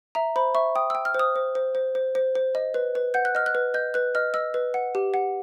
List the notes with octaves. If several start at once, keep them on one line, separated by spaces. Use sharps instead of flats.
E5 A#5
C5 B5
E5 C#6
G5 D#6
G5 E6
F6
C5 D#6
C5
C5
C5
C5
C5
C5
D#5
B4
B4
F#5 G6
F#6
D#5 F6
F#6
B4
D#5 G6
B4 F#6
D#5 F6
D#5 E6
B4
F#5
G4
F#5